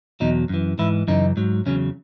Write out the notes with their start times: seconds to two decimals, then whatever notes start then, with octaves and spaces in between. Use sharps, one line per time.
0.20 E2 B2 F#3 D#4
0.49 F#2 E3
0.79 G#2 E3 E4
1.08 F#2 C#3 E3 D#4
1.37 G#2 F#3
1.66 E2 C#3 F#3 C#4